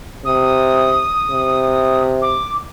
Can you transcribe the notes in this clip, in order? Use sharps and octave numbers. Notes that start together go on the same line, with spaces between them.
C3 D#6
C3
D6